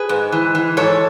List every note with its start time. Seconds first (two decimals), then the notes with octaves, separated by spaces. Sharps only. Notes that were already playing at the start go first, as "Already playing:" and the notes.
Already playing: G#4 B4
0.09 G#2
0.32 E3
0.55 E3
0.77 G#2 A4 C#5